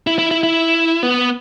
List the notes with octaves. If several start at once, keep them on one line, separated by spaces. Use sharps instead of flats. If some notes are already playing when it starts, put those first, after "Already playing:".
E4
E4
E4
E4
B3